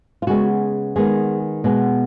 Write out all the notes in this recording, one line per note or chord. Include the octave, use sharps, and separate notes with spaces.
F4
C#3 G#3 B3 F#4
D#3 G#3 B3 G#4
B2 G#3 B3